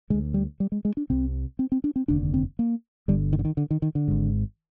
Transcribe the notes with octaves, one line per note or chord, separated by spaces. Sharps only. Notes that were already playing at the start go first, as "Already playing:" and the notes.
D3 G#3
D2
G3
G3
G#3
G#3
D4
C2 C3 C4
C4
C4
D4
C4
F1 D#2 D3 D4
C4
A#3
G1 G2 D3 G3
D#3
D3
D#3
D3
D#3
D#3
D3
G#1 G#2